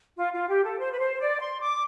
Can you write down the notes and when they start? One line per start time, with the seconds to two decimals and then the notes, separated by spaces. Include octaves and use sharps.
0.17 F4
0.32 F4
0.48 G4
0.63 A4
0.78 C5
0.92 B4
0.99 C5
1.19 D5
1.40 C6
1.60 D6